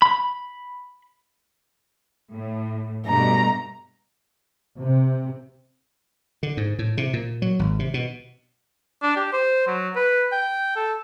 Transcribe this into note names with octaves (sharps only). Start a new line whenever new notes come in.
B5
A2
G2 B2 A3 A#5
C3
D3
G#2
A2
C3
A#2
F#3
G#1
C3
B2
D4
G4
C5
F#3
B4
G5
A4